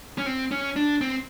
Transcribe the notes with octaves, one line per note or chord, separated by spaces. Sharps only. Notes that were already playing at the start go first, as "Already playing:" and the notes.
C#4
C4
C#4
D4
C4